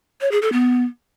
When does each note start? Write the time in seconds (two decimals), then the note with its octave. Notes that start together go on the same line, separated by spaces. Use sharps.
0.21 C#5
0.31 G#4
0.42 A4
0.52 B3